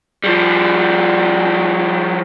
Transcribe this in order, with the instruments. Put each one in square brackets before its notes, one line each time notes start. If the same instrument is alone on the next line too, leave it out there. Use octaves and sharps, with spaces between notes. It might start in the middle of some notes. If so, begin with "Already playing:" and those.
[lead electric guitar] F3 G3